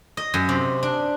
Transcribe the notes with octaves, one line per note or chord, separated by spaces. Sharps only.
D#5
F#2
C3
D4